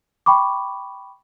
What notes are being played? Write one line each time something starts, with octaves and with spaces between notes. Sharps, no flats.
G5 B5 C#6 D6